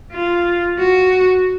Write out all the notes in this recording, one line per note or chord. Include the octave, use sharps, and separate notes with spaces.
F4
F#4